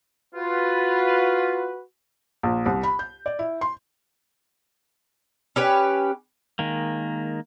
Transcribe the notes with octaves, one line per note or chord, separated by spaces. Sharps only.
F4 F#4 B4
A#1
C2
B5
G6
D5
E4
C6
C#4 G4 B4
D#3 G#3 A#3